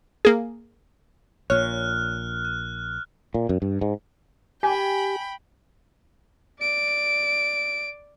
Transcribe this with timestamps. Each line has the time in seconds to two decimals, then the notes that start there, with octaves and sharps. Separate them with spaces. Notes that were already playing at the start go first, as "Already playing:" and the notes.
0.25 A#3 G#4
1.50 A#1 A#2 C#5 F6 F#6
2.45 F#6
3.34 A#2
3.49 F#2
3.62 G2
3.81 G#2
4.63 G4 G5 G#5 B5
6.60 D5 D7